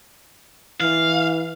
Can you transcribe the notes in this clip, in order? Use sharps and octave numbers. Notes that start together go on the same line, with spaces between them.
E3 F5